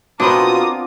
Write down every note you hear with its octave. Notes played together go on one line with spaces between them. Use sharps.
B2 B3 C4 D4 F4 A#4 D6 D#6